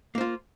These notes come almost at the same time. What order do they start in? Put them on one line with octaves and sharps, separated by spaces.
A#3 C5 F4